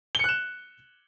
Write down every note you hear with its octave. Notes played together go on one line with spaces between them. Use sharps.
F#6 C#7 E7 G7